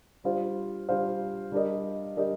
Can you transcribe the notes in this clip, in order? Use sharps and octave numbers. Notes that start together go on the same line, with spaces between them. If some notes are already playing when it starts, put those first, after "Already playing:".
G3 D4 F4 C5 F5
G3 D4 F4 C5 F5
G3 D4 G4 A#4 D#5
G3 D4 G4 A#4 D#5